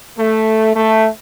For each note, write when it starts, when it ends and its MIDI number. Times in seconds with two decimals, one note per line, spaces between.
0.18 0.72 57
0.75 1.07 57